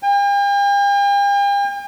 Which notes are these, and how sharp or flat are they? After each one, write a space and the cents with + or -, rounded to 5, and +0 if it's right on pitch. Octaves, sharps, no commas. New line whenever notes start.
G5 +45